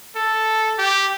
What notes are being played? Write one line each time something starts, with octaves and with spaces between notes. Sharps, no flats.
A4
G4